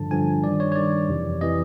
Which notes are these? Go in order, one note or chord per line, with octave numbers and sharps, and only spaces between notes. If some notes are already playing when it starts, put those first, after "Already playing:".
Already playing: G2 D3 F3 A5
G2 D3 F3 G#5
G2 D#3 D5
C#5
C#5
G2 D#3 D5
F2 C3 E3
C3 E3 D#5